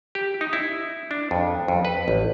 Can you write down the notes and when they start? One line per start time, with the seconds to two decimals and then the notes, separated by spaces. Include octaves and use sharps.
0.15 G4
0.41 D#4
0.53 E4
1.11 D4
1.31 F2
1.68 F2
1.85 B4
2.08 A1